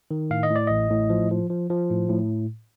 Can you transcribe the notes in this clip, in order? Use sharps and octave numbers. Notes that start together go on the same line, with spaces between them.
D#3
A2 F5
D#5
A2
D5
A1 D#5
A2
F3
F3
F3
F3
A2
A2